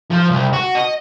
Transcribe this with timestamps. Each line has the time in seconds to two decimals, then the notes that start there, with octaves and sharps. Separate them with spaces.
0.11 F3
0.31 C2
0.53 F#4
0.75 D#5